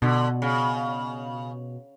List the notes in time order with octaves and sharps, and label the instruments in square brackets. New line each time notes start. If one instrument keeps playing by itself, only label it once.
[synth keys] B2 [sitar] D3
[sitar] C#3